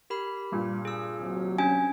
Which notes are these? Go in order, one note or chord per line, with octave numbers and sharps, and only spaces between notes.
G4 A#4 B5
G2 A#2
G#4 E6
D#2 C3 F#3
C#4 D4 G#5